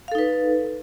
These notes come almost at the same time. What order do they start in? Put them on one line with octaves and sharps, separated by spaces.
F5 A4 D#4 B4